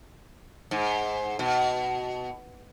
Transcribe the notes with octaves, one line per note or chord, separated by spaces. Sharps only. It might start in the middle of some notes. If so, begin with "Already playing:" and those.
G#2
B2